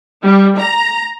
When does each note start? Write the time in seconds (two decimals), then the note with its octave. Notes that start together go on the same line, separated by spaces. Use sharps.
0.23 G3
0.58 A#5